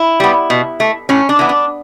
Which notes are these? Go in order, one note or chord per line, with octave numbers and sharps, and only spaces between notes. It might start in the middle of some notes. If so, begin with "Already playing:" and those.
Already playing: E4
G3 B3
B2
A3
A2 C#4
D4
E3 B3
D4